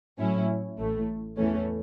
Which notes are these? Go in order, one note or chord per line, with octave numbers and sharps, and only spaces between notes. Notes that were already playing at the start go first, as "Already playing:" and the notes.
A2 F#3 C#4 E4
A1 A2 A3
E2 E3 A3 C#4